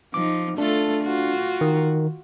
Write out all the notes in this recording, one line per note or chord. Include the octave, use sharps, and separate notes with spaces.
F3 D#4 D6
A3 D4 F4 A4
F4 F#4
D#3